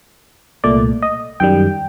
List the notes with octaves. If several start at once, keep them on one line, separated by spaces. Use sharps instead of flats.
C2 A#2 A3 D5
D#5
F#2 D#3 G3 G5